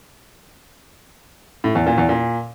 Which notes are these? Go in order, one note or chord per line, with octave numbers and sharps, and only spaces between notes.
A2
E2
A#2
E2
A#2